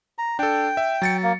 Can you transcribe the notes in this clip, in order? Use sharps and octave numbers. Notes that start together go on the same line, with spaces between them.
A#5
D4 A4 G5
E5
F#3 A6 C#7
A#3